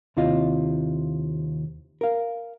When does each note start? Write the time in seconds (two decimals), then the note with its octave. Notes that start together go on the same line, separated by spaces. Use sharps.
0.17 D#2 C3 E4 F4 D#5
2.01 A#4 F5